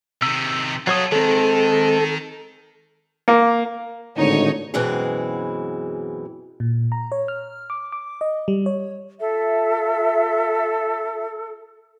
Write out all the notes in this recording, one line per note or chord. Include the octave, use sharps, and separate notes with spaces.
C3 D#3 E6
F#3 F4 A4 C#5 D#6
D#3 G#3 C4 A4
A#3
G#1 A2 D3 D#4 C#5
F#2 B2 E3 G#3 C4 G#4
A#2
A#5
C#5
F6
D6
D6
D#5
G3
C#5
F4 A4 E5